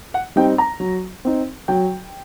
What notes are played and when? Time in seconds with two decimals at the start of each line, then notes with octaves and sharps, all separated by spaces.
0.14 F#5
0.36 G3 C4 D#4 G5
0.58 A#5
0.80 F#3
1.25 C4 D#4
1.68 F#3 G5